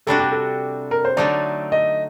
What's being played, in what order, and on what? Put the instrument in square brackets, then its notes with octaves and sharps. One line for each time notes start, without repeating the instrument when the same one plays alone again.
[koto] C3 G3 D4 F#4 [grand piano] A4
[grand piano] G4
A4
A#4
C5
[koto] D3 F#3 A3 D#4 [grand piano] D5
[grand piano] D#5